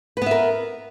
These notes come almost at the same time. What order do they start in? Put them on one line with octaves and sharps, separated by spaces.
B4 B3 E5 A#4